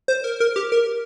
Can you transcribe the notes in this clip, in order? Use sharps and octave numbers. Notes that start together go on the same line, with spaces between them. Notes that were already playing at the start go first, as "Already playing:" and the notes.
C5
A#4
A#4
G4
A#4